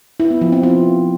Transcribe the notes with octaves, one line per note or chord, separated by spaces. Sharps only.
E4
B3
F3
C4
F4